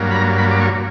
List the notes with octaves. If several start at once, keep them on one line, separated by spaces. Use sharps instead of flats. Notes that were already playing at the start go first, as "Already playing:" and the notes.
Already playing: G2 F#3 A#3
B5
A#5
B5
D6
C#6